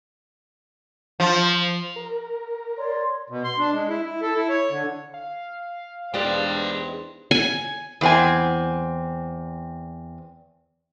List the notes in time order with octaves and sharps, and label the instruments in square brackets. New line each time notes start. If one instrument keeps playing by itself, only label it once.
[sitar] F3
[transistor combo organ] A#4
[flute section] C#5 D5 C6
[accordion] B2
C6
D4
G#3
E4
E4
A4
E4
C#5
D3
[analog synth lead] F5
[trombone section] E2 D#4 C5 [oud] G#3 D4 G4 [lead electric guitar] B4 G5
[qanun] G#5
[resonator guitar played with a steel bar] E2 C4 G#5